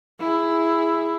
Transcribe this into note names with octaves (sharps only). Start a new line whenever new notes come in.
E4 G#4